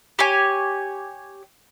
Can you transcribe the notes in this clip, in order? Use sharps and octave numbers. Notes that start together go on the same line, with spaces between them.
G4 C#5 G#5